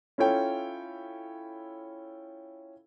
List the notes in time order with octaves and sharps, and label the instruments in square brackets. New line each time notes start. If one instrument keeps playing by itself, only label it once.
[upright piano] C#4 E4 F4 A4 C#5 G5